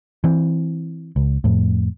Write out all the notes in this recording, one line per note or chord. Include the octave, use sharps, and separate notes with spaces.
E3 C4
C#2
F2 A2